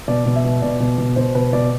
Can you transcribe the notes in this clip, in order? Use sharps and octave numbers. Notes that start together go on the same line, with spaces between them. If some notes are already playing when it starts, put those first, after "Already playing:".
B2 D5
B2
E5
B2
B2 D5
B2
B2
B2 C5
B2 B4
B2 D5